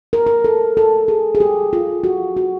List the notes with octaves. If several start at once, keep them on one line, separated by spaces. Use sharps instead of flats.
A#4
A#4
A4
A4
G#4
G#4
G4
F4
F#4
F#4